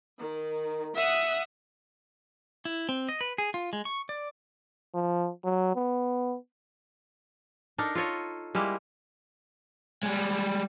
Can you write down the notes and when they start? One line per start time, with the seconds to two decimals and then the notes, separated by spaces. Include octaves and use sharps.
0.19 D#3
0.96 E5 F#5 D#6
2.65 E4
2.89 C4
3.09 D#5
3.21 B4
3.38 G#4
3.54 F4
3.73 G#3
3.85 C#6
4.09 D5
4.94 F3
5.44 F#3
5.76 B3
7.78 D4 D#4 A4 A#4
7.95 F4 A4 C#5 D#5
8.55 G3 G#3 A#3 E4
10.03 G3 G#3